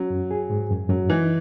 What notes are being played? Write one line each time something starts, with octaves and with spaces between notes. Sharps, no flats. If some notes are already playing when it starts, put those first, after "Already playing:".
Already playing: F#3 C#4
F#2
G#4
G#2
F#2
F#2 F#3
E3 D#4